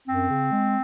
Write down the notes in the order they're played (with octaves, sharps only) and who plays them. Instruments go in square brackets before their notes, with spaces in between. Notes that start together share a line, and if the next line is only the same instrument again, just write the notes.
[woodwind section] F#2 C4
C#3
G#3